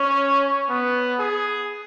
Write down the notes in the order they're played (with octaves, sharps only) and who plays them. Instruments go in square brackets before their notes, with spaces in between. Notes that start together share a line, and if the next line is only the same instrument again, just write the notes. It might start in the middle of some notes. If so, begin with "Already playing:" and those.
Already playing: [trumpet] C#4
B3
G#4